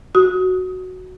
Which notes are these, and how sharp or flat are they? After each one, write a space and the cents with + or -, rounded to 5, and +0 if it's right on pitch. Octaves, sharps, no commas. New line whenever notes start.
F#4 +0 D#6 +20